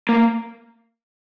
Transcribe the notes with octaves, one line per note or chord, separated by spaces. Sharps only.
A#3